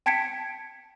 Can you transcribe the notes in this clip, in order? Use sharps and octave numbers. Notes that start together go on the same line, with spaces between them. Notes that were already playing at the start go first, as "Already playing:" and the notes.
G5 A5 G#6 B6 C#7 D7